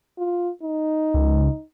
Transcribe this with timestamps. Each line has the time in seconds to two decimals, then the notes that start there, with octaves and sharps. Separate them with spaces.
0.19 F4
0.63 D#4
1.14 C#2